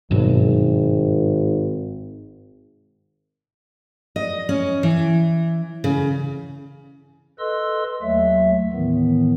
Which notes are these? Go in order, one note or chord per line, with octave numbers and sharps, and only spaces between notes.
G#1 G2 B2 F#3
D#5
C#4
E3
C#3
A4 B4 D#5 C6 E6
D#2 F#3 A3 E5
A2 D#3 E3 B3